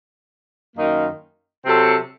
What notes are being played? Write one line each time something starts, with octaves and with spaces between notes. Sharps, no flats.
F#2 D#3 A#3 D#4
C3 F#3 C4 F#4 A4